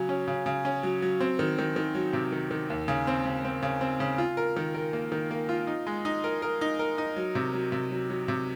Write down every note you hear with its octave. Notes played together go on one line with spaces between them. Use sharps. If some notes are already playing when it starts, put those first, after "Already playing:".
Already playing: C#3 F#3
C#4
C#3
C#3
C#4
F#3
F#3
C4
D#3
D#3
D#3
F#3
C3
D#3
D#3
D#2
C#3
C4
C#3
C4
C#3
C4
C#3
F4
A#4
D#3
A#4
A#3
D#3
A#3
F4
D#4
G#3
D#4
A#4
A#4
D#4
A#4
D#4
F#3
C3
F#3
C3
F#3
F#3
C3